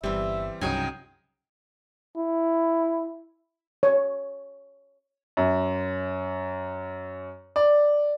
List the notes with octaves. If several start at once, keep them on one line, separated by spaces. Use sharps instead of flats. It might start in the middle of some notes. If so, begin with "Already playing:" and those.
G1 E3 G3 C4 G4 E5
C2 G2 C#3 F#3 D#4 F#4 G5 G#5
E4
C#5
F#2
D5